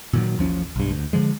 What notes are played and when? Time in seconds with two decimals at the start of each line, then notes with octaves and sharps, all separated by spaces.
0.13 A#2 D#3 F#3
0.38 A1 D#2 F3 C#4
0.76 B1 G2
0.91 D2
1.13 D3 F3 G#3